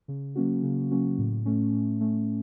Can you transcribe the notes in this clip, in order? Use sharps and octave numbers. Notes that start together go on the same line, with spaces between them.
C#3
F#3 A#3 C#4 F#4
C#3
F#3 A#3 C#4 F#4
A2
A3 C#4
A2
A3 C#4